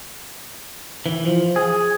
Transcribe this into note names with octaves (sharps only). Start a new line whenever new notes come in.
E3
F3
G#4